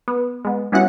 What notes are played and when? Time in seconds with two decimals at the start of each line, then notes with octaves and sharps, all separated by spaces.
0.08 B3
0.45 G#3 B3
0.72 G3 B3 C#4 E4 F#4 F#5